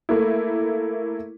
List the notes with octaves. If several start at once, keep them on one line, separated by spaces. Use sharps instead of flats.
A3 A#3 E4